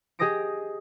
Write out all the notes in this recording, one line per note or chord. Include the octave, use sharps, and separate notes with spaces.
G4 G#4 D#5 D#6 A#6 D7